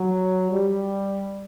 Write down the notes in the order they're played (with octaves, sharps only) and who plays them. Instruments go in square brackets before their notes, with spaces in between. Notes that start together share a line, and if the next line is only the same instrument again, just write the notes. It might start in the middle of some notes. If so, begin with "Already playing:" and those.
Already playing: [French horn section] F#3
G3